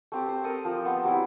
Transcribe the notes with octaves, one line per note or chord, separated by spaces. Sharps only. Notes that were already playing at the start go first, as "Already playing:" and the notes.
A3 C4 G4
C5
A4 A#4 D#6
F3
B3 C6
F#3 G3 C4 E4